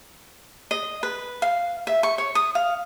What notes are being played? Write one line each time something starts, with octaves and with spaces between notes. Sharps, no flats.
D#5
B4
F5
E5
C#6
C#5
D#6
F5